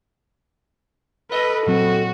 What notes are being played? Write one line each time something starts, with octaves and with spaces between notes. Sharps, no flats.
A4 B4 D#5
A#2 F#3 C4 F#4